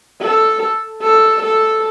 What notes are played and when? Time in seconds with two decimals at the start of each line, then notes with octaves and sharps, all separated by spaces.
0.22 A4
1.02 A4
1.43 A4